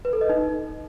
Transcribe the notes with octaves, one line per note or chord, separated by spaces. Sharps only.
B4
A4
D#5
D#4